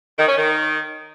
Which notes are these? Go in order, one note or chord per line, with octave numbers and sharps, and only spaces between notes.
D#3
C#4
D#3